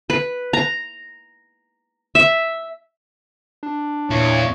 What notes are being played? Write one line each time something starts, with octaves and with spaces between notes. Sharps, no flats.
B4
A#5
E5
D4
E2 A#2 E4 C#5